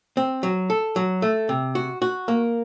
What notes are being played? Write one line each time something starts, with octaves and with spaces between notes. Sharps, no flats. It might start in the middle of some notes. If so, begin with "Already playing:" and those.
C4
F#3
A4
F#3
A3
C3
F#4
F#4
A#3